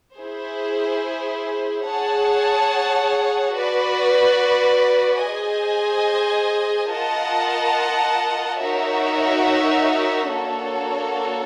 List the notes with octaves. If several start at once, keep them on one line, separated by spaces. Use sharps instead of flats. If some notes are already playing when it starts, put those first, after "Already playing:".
E4 G#4 C5
G#4 C#5 F#5 A5
F#4 B4 D5
G#4 C5 D#5 G#5
F4 A#4 D#5 F#5 A5
D#4 F#4 A#4 C#5 E5
A#3 D4 F#4 A4 C#5